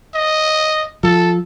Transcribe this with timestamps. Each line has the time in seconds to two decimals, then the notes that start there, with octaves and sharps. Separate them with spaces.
0.14 D#5
1.03 F3 A4